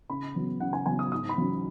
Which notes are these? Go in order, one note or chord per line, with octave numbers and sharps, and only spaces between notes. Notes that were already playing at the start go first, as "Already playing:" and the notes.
C#3 B5
F#3 B3
C#3 F#5
G#5
F#3 B3 G#5
D#6
G#2 D#6
B5
F#3 C#4